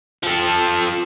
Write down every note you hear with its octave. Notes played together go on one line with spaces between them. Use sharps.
F3 A4